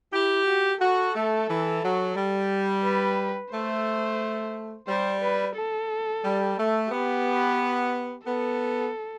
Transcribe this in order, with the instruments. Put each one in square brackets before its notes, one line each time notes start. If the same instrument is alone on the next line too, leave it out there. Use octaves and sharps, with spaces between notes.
[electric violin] E4 [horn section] G4
[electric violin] F#4
[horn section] F#4 [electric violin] A4
[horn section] A3
E3
F#3
G3
[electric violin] B4
[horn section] A3 [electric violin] C5
[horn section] G3 [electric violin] C5
[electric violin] B4
A4
[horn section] G3
A3
[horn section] B3 [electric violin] G4
[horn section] B3 [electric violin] A4